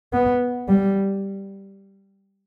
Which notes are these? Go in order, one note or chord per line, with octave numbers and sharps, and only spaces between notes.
B3
G3